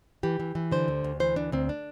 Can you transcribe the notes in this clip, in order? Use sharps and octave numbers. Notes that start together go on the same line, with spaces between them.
E3 G4
E3
E3
D3 C5
D2
D2
E3 C5
D2 D4
D2 C4
D4